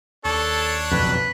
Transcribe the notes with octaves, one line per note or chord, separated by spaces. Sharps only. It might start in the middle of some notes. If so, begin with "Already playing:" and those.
D#2 D4 A4 C#5
F#1 B1 F2 B4